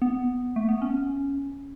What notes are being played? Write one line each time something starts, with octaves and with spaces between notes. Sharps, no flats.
B3
A3
B3
C#4